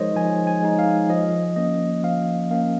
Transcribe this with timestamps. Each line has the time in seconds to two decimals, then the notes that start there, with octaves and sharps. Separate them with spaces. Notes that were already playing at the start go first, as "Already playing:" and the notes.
Already playing: F3 G#3 D#4 G#4 A#4 C5 C#5 D#5
0.16 F3 G#5
0.47 G#5
0.63 G#3 D#4
0.79 F5
1.09 F3 D#5
1.56 A#3 C#4 D#5
2.03 F3 F5
2.51 A#3 C#4 F5